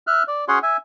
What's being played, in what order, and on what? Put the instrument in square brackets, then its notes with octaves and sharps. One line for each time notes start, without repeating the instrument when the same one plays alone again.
[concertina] E5 F6 F#6
D5
C#4 F#4 G#4 C#5 F#5 C6
E5 G#5